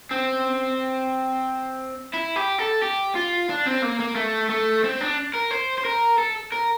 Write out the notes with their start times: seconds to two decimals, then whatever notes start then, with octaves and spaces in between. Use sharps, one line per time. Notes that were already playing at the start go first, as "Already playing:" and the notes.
0.11 C4
2.14 E4
2.36 G4
2.58 A4
2.82 G4
3.15 F4
3.49 D4
3.66 C4
3.82 A#3
4.00 A#3
4.16 A3
4.50 A3
4.84 C4
5.01 D4
5.34 A#4
5.51 C5
5.78 C5
5.85 A#4
6.18 A4
6.52 A#4